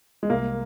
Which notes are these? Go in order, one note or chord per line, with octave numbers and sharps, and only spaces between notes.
G#3
C2 A#3